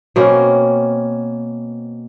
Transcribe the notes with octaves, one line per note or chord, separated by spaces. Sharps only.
B2 A#3 C4 C#4